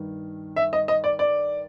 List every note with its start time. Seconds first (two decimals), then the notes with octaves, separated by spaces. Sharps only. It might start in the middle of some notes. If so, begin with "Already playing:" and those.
Already playing: G2 D#3
0.56 E5
0.73 D#5
0.88 D#5
1.04 D5
1.19 D5